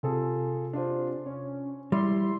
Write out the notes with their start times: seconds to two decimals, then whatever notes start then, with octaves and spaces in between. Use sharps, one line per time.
0.03 C3 F4 G#4 A4
0.73 D4 F4 C5
1.26 C#4 C#5
1.92 G3 E4 C6